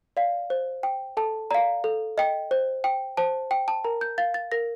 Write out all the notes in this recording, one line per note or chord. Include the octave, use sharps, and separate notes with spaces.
D5 F5
C5
G5
A4 A5
D5 F5 A#5
A4
D#5 G5
C5
G5
C5 A5
G5
A5
A#4 A#5
G6
F5 A6
A6
A#4 A#6